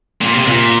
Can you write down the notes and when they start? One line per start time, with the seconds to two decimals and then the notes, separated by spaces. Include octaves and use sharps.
0.21 A#2
0.33 C3
0.46 A#2